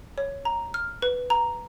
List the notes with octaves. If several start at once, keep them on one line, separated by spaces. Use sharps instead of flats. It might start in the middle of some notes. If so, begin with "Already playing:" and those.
C#5
A#5
F6
B4
A#5